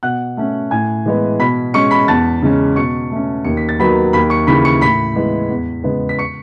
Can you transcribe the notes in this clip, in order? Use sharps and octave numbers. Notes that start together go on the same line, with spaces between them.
B2 F#5 F#6
A3 C#4
A2 G#5 G#6
E3 G#3 B3
B2 B5 B6
G#3 C#4 C#6 C#7
B5 B6
E2 A5 A6
C#3 G#3 C#4
B2 C#6 C#7
A3 C#4
D#2 C#7
B6
A6
D#3 F#3 B3 B5 B6
D#2 B5 B6
C#6 C#7
C#3 E3 B5 B6
C#6 C#7
A2 B5 B6
E3 G#3 B3
E2
C#3 G#3 B3
B6
C#6 C#7